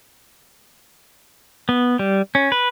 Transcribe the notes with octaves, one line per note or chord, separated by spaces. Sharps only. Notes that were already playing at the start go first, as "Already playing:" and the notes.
B3
G3
C#4
B4